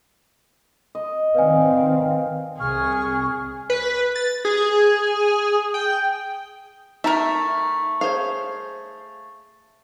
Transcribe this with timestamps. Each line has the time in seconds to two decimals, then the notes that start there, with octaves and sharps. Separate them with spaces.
0.95 D#5
1.35 D#3 C4 B4 D5 F5 G#5
2.60 C2 C3 G#4 C#6 F6
3.70 B4
4.15 A6
4.45 G#4
5.74 G5
7.04 A3 D#4 A#4 E5 A#5
8.01 G#4 C5 C#5 F5